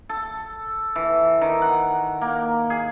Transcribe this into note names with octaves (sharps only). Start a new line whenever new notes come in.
A4
E3
D#3
F#5
A#3
G#4